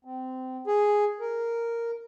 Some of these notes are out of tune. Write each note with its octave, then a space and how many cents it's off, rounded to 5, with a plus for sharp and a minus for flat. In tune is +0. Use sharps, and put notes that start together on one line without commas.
C4 -20
G#4 +0
A#4 -5